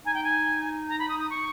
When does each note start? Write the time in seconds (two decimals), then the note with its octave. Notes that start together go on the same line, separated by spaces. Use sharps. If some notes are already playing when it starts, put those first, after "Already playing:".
0.05 D#4 G#5
0.14 G5
0.24 G#5
0.89 A#5
0.99 B5
1.09 D#6
1.19 D#6
1.30 C#6